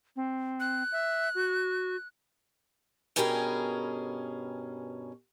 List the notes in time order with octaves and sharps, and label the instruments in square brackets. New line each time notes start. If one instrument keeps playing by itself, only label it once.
[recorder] C4
[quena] F#6
[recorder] E5
F#4
[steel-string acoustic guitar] G2 B2 C#4 G#4 A#4 G5